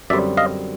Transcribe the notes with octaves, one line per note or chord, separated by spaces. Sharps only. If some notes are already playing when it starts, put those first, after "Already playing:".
F#2 D3 G3 C4 D5 E5
D#5 F5